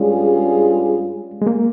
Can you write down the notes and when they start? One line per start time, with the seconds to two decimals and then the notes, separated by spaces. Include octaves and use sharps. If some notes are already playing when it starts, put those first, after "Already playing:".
Already playing: G2 G3 G#3 C#4 F4 G#4
1.42 G#3
1.47 A#3